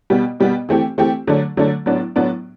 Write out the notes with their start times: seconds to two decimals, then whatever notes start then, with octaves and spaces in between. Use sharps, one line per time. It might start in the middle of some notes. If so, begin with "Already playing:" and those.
0.10 B2 G3 B3
0.40 B2 G3 B3
0.69 E3 A3 C4 G4
0.98 E3 A3 C4 G4
1.27 D3 F#3 A3 D4
1.57 D3 F#3 A3 D4
1.86 A2 F#3 B3 D4
2.16 A2 F#3 B3 D4